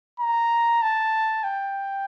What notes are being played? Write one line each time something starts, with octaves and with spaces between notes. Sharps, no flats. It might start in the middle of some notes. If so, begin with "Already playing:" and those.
A#5
A5
G5